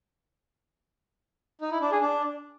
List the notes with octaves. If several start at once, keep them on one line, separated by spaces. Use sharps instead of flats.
D#4
E4
D4
G#4
D4